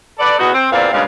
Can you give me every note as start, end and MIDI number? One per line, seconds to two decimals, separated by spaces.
0.19 0.35 69
0.19 0.35 71
0.19 0.35 74
0.39 0.53 40
0.39 0.53 59
0.39 0.53 63
0.39 0.53 66
0.54 0.67 60
0.72 0.92 40
0.72 0.92 46
0.72 0.92 60
0.72 0.92 74
0.72 0.92 77
0.92 1.03 43
0.92 1.03 46
0.92 1.03 49
0.92 1.03 56
0.92 1.03 77